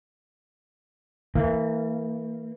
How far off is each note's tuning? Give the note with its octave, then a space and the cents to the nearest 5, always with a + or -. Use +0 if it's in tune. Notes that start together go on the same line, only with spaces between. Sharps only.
E3 -15 A#3 -35